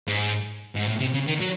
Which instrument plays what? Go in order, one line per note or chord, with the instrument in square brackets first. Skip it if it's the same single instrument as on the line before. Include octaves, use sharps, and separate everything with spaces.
[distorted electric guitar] G#2
G#2
A2
C3
C#3
D#3
F#3